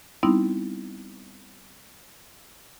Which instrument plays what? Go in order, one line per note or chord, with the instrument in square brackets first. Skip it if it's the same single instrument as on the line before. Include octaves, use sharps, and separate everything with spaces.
[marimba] G3 B3 C4 D#4 E4